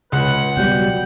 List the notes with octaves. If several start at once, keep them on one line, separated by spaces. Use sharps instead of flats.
C#2 B4 F#5
B2 F#3 G3 G5